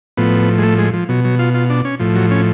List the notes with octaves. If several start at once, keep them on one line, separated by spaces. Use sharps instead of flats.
A2 F3 B3
G#3
A3
G#3
F3
B2 F#3
F#3
F4
F4
D4
C#4
A2 F3
F#3
C#4